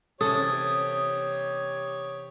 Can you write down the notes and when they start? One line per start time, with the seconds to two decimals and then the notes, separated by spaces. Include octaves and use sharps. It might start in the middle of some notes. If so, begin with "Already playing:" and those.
0.21 C3 E3 C#4 G4 A4 C#5 D#6